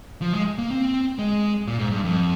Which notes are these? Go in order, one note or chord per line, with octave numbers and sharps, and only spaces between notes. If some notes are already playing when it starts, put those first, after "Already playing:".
F3
G#3
A#3
C4
G#3
A#2
G#2
G2
F2